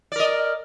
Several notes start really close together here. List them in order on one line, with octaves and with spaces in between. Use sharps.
D5 A#4 D#5